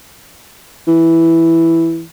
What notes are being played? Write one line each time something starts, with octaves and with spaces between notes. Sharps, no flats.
E3